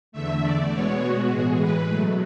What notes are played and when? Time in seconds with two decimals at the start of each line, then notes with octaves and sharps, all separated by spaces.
0.12 E2 D3 A3 E5
0.42 D5
0.71 B2 G#3 B3 C#5
1.00 F#4
1.30 A2 E3 G#3 G#4
1.60 B4
1.90 B2 F#3 A3